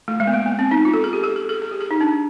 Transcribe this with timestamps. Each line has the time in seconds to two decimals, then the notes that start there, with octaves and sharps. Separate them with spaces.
0.08 A3
0.20 G#3
0.27 B3
0.33 A#3
0.46 B3
0.59 C4
0.71 D#4
0.85 F4
0.94 A4
1.04 G#4
1.13 G4
1.24 A4
1.36 G#4
1.49 G#4
1.62 G#4
1.71 G4
1.81 G#4
1.91 D#4
2.01 D4